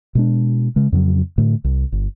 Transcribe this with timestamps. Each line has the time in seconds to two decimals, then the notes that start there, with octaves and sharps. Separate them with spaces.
0.15 B2 G#3 D4
0.76 C#3 G#3
0.92 F2 C#3 F#3
1.38 A2 D3 A3
1.64 C2
1.92 G1